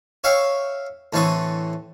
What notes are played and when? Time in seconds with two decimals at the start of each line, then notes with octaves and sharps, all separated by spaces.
0.24 C#5 E5 F5 G5 C#6
1.13 A2 D3 E3 C4 C#6 D#6